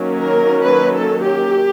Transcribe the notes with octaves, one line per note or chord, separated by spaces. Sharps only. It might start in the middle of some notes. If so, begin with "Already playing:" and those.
Already playing: D#3 F#3 A#3 C#4
A#4
B4
A4
G4